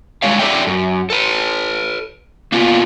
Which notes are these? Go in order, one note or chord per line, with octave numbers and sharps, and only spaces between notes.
G3 G#3 C#5 F5
G4 A4 D5 E5 G5
F#2
A4 B4
A#3 B3 F4